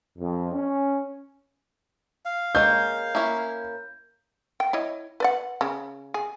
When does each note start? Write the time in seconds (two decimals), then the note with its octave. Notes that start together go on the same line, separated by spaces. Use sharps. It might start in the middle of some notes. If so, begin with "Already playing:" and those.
0.17 F2
0.52 C#4
2.25 F5
2.55 G#3 A#3 C#4 G6
3.15 A#3 C#4 E4
4.60 G5
4.73 E4 C#5 D#5
5.20 B4 D5 F#5
5.61 C#3
6.14 G#4